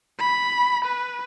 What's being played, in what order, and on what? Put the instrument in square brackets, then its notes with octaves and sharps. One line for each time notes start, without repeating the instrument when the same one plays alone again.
[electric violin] B5
B4